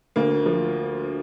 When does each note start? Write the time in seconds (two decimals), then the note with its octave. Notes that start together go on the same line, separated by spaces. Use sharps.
0.16 D2 A#3
0.46 F3